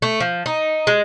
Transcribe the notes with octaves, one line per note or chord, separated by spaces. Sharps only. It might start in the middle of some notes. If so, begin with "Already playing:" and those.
A3
F3
D#4
G#3